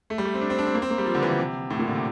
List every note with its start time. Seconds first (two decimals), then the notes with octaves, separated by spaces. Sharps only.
0.10 A3
0.18 G3
0.25 A3
0.34 C4
0.41 D4
0.50 C4
0.59 D4
0.67 C4
0.74 A#3
0.82 C4
0.90 A#3
0.98 G3
1.06 F3
1.15 D3
1.23 E3
1.31 D3
1.39 C3
1.70 A2
1.79 A#2
1.87 D3
1.95 C3